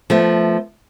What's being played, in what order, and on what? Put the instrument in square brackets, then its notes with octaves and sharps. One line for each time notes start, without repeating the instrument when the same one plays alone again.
[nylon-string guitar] F3 A3 B3